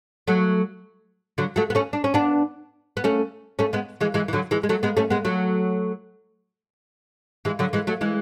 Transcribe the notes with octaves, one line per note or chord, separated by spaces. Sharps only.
F#3 A3
D3 F#3
F#3 A3
B3
A3 C#4
D4
C#4
B3 D4
B3
A3 C#4
A3 C#4
G#3 B3
E3 G#3
E3 G#3
E3
D3 F#3
E3 G#3
G#3
F#3 A3
G#3 B3
A3 C#4
G#3 B3
F#3 A3
E3 G#3
D3 F#3
E3 G#3
F#3 A3
E3 G#3